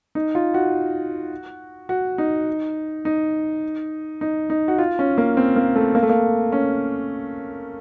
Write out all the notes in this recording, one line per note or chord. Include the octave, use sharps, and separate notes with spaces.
D#4
F4
F#4
F#4
D#4
D#4
D#4
D#4
F#4
F4
C#4
A#3
C4
A#3
A3
A#3
A3
A#3
C#4